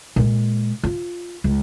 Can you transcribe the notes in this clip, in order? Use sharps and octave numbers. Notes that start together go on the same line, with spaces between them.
A#2 G#3
F4
C#2